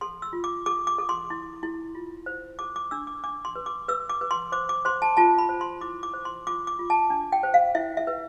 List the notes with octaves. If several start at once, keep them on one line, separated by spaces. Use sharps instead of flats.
A4 C6
E6
F4
D6
A4 D6
D6
A4
C6
E4
E4
F4
C5
A4 D6
D6
D4 E6
D6
D4 D6
C6
B4
D6
B4 E6
D6
B4
C6
C5 D6
D6
C5 C6
A5
F4 A5
B5
C5
C6
E4 D6
D6
C5
C6
F4 D6
D6
F4
A5
D4
G5
C5
F5
E4 E5
E5
B4